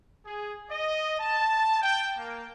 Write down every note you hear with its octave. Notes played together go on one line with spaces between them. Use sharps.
G#4
D#5
A5
G5
A#3